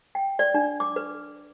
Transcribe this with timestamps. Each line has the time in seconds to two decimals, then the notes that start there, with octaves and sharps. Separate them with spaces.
0.15 G5
0.39 D5
0.54 D4
0.80 D6
0.96 B4